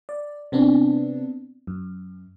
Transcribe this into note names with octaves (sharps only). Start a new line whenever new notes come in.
D5
C3 B3 C4 D4
F#2